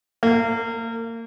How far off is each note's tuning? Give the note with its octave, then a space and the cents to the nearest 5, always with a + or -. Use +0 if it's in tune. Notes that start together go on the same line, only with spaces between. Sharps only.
A#3 -30